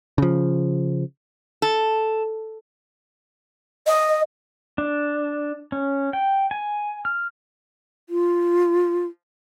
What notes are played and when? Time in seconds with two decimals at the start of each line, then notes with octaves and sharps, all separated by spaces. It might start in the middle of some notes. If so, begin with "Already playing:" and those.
0.18 C#3 F3
1.62 A4
3.86 D#5
4.78 D4
5.72 C#4
6.13 G5
6.51 G#5
7.05 F6
8.09 F4